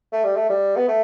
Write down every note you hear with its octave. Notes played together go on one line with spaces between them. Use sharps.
A3
G3
A3
G3
B3
A3